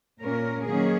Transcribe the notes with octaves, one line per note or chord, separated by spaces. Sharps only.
A#2 A#3 C#4 A#4
D#3 F#3 A#3 C#4 G#4